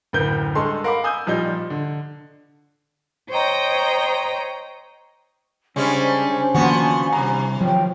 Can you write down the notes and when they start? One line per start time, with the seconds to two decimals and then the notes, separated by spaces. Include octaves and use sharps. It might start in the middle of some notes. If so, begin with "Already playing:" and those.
0.13 F#1 D2 A2 A#4 B4 G6
0.55 G2 G#3 A4 C6 C#6
0.84 A#4 F5 F#5 B5 D6
1.04 G#5 D#6 E6 G6
1.26 A#2 F3 G3 D#4 G6
1.70 D3
3.30 C5 C#5 D#5 G5 A#5
5.76 C#3 G3 G#3 C#4 D4 C5 G#5
6.54 D#3 F3 A#3 B3 F#4
7.13 C2 C3 A#5
7.61 D#3 F3 F#3 C5 C#5 G5